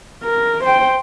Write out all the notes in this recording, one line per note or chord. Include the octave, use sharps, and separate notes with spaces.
A#4
C5 G5